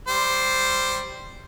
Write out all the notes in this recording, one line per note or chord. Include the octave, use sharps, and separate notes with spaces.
G3 C5